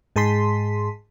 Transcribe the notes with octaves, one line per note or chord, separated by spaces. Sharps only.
G#2 G#4 A5 C6 B6